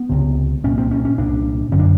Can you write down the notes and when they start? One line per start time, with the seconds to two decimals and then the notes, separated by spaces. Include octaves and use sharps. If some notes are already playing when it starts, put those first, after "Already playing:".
Already playing: B3
0.09 C#2 C3
0.64 C2 A#2 C#4
0.78 C4
0.91 C#4
1.05 C#4
1.18 C2 A#2 D4
1.72 F#2 D3 C#4
1.79 D4